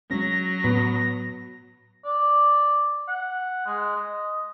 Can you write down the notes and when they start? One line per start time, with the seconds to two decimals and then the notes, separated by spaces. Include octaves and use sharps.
0.11 F#3 G#3 C#4 A#6
0.64 A2 B3
2.05 D5
3.08 F#5
3.67 G#3
3.96 D#5